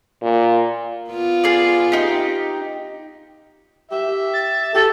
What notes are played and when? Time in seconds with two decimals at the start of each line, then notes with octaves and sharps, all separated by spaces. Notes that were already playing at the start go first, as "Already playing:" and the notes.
0.23 A#2
1.11 B3 F4
1.44 G#4 D5
1.92 D#4 G4
3.91 G4 E5
4.33 A6
4.75 G4 A4